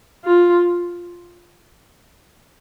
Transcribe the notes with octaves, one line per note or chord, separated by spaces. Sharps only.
F4